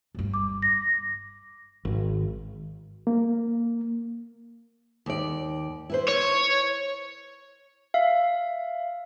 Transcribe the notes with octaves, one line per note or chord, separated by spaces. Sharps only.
G1 G2
D6
A#6
G#1
A#3
D#2 D5
E4 B4 C5
C#5
E5 F5